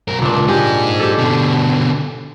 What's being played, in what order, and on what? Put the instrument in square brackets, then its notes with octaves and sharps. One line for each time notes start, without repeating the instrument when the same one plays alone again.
[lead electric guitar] B1 A#4
[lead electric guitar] C#2 [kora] A#2 D4
[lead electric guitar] D#4 G#4 [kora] G4
[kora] G4 A4
[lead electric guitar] B2 D3